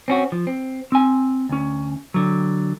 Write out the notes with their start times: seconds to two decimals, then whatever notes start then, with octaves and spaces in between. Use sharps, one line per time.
0.08 C4 C#4 F#4
0.32 F3
0.47 C4
0.92 C4 G#5
1.49 D2 C#4
2.14 D3 F#3